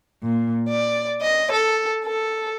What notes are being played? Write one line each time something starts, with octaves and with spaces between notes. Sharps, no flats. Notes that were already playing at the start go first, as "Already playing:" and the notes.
A#2
D5
D#5
A4
A4